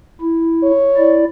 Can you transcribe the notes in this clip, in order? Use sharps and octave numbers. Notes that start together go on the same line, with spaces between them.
E4
C#5
E4 D5